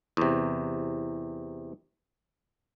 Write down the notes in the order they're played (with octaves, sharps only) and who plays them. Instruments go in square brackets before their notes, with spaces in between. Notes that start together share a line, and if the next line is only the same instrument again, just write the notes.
[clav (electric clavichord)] E2 C3